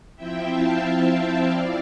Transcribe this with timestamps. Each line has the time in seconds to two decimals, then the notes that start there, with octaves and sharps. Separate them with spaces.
0.16 F3 C4 E4 E5 G5
0.49 F5 A5
0.83 E5 G5
1.16 E5 G5
1.48 F3 C4 E4 D5 F5